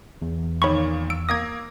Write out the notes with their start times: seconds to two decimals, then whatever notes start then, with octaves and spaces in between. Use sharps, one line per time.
0.22 E2
0.62 A#2 D#3 C#5 B5 C#6
1.10 E6 D7
1.29 A#3 D#6 G#6 A#6